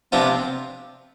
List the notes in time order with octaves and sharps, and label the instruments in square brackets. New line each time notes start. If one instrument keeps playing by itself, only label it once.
[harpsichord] C3 F3 B3 D4 F4 [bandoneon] C4